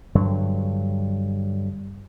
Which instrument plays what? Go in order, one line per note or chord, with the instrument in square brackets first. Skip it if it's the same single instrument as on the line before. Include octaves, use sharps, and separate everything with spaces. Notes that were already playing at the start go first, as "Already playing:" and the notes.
[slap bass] G2 D3 F#3